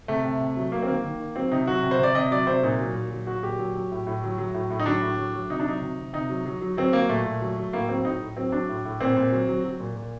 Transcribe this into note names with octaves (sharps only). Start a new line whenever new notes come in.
C3 A3
C3
C3
F#3
F#3 A#3
C4
D#3 A#3
D#3
D#3
F#3 C4
C3 D#4
F#3 F#4
C3
C5
C3 D5
C3 D#5
F#3 D5
C3 C5
A#2 D#4
F#3
A#2
F#3
F#3 F#4
A#2 G4
F#3
F#3
A2
A2
F#3
F#3
A2
A2
D#4
F#3 D4
A2
F#3
F#3
C3 D#4
D4
F#3 D#4
C3
C3
C3 D#4
F#3
F#3
F#3
F#3 C4
F#3 A#3
A#2 A3
A#2
F#3
F#3
A2 A#3
F#3 C4
A2 D#4
A2
F#3 C4
F#3 D4
A2
A2
A#2 C4
A#2
F#3
F#3
F#3
A#2
A#2